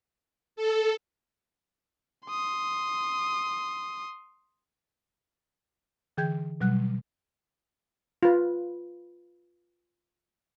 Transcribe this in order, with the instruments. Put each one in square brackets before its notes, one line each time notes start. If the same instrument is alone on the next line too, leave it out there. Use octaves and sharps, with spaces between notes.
[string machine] A4
[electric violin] C6 D#6
[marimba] D3 E3 G#4 G5 G6 G#6
B2 F#3 G3 F#5 F#6
[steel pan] F4 B4